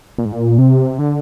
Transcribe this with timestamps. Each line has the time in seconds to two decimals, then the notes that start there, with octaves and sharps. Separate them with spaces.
0.19 A#2
0.25 G#2
0.32 A#2
0.58 C3
0.99 D3